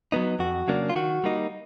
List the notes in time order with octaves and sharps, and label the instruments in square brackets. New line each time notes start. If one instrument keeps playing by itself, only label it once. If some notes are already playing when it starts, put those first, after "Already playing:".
[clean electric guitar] F#3 B3 D#4
F2 F#4
C#3 F#3 A#3 D4
F4
D#3 F#4
G3 A#3 D#4